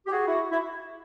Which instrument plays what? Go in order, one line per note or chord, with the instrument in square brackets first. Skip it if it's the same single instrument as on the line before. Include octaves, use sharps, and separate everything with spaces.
[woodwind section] G4
F#4 G#4
E4 F#4
E4